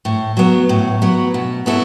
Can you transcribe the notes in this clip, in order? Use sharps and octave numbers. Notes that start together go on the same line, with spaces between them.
A2
F#3 B3
A2
F#3 B3
B2
F#3 B3 E4 A4